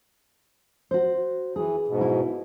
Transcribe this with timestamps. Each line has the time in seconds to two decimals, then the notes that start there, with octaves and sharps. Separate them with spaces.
0.91 F#4 C5
1.56 E3 G#4
1.88 G#2 B2
2.01 E4